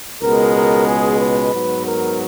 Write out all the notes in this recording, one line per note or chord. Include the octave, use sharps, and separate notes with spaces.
C#2 B2 G#3 B3 A#4
A#4
G#4
B4
G#2 F#3 B3
A#4